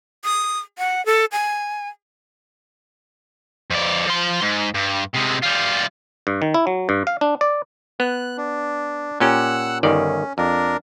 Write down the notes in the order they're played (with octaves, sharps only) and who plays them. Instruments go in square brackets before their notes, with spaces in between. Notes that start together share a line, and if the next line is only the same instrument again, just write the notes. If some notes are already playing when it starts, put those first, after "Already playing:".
[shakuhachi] D#6
F#5
A4
G#5
[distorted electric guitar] F2 D5
F3 C6
G#2
G2
C3 G#3
G3 F4
[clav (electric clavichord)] G2
D#3
E4
F#3
G2
F5
D4
D5
[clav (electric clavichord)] B3 [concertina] F#6
[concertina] D4
[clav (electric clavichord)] A#2 C#4 G4 [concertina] F#5 E6 F#6
[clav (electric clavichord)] G1 D#3 D5 [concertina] C#4
[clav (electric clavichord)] F2 [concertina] D4 A#4